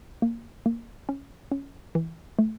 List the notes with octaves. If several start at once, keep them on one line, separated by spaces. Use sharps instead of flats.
A#3
A#3
C#4
C#4
E3
A3